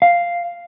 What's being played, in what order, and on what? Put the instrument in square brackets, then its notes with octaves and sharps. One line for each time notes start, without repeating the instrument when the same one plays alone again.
[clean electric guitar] F5